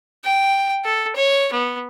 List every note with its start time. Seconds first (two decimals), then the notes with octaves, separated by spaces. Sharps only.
0.24 G5
0.85 A4
1.15 C#5
1.52 B3